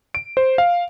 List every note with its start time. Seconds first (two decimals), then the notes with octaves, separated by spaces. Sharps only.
0.15 D7
0.37 C5
0.58 F5